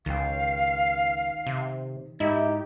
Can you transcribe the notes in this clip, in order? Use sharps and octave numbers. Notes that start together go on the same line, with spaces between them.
C#2 D#3 F5 G5
C3
G#2 D#4 E4 G4